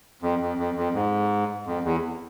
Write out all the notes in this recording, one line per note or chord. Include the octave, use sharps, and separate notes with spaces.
F2
F2
F2
F2
G#2
F2
E2